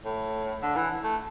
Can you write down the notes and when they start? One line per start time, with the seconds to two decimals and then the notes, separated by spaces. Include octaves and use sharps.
0.05 A2
0.63 D3
0.76 E3
1.04 A3